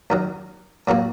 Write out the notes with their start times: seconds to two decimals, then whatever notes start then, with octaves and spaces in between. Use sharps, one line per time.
0.10 F#2 D#3 F#3
0.87 A2 F#3 A#3 F#4